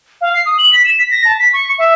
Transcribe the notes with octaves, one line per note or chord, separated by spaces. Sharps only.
F5
C7
D#6
F#7
B6
E7
B6
A#6
A5
B6
C#6
E5